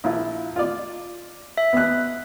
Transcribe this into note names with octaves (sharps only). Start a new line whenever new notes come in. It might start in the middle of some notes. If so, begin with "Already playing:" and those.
A#1 E4 F4
F4 D5
E5
B3 F#6